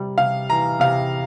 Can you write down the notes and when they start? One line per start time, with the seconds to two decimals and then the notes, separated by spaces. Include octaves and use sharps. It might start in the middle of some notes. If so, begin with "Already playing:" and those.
Already playing: C3 G3
0.18 C3 F5
0.49 E3 A#5
0.80 C3 F5